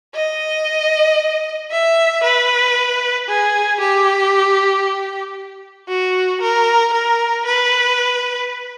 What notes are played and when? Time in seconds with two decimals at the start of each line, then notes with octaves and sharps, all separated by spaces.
0.15 D#5
1.71 E5
2.24 B4
3.28 G#4
3.80 G4
5.88 F#4
6.41 A#4
6.93 A#4
7.45 B4